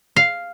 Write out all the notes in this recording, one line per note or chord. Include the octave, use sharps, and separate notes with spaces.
F5